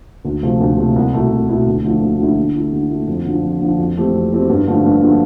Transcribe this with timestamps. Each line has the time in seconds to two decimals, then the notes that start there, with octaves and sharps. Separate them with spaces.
0.25 D2
0.43 C3 F3 A3
0.60 D2
0.78 C3 F3 A3
0.96 C2
1.13 B2 A3 E4
1.31 C2
1.48 B2 A3 E4
1.66 D2
1.84 D3 F3 A3 E4
2.02 D2
2.19 D3 F3 A3 E4
2.37 D3
2.55 A3 E4
2.72 D3
2.90 A3 E4
3.08 F2
3.25 D3 F3
3.43 F2
3.61 D3 F3
3.79 F2
3.96 E3 A3 C4 G4
4.13 F2
4.32 E3 A3 C4 G4
4.50 G2
4.67 D3 F3 A3
4.84 G2
5.02 D3 F3 A3